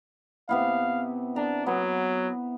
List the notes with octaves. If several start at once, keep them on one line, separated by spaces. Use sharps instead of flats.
C3 B3 E4 F5
D4 A#5
F#3 B3